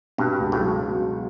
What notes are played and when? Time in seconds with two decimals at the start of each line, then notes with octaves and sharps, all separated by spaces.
0.18 G2 B2
0.40 C#2
0.52 A2
0.59 F#3